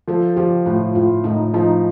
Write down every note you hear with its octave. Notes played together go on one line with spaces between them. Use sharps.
F3 A4
F3 G4
A2 F4
A2 F4
A2 D#4
F3 D#4